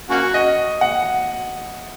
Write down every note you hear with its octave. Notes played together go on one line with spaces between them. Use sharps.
A#3 C#4 F#4
D#5
F#5